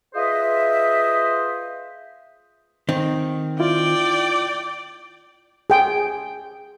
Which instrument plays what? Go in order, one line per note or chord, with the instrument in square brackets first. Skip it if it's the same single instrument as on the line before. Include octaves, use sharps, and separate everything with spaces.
[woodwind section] F4 G#4 B4 C5 D#5 E5
[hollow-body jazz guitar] D#3 C4
[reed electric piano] E4 F4 [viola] D5 G5
[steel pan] G#4 G5